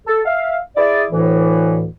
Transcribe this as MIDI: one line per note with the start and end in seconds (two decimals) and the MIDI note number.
0.07 0.19 69
0.25 0.57 76
0.25 0.57 77
0.76 1.04 64
0.76 1.04 68
0.76 1.04 74
1.11 1.87 38
1.11 1.87 45
1.11 1.87 52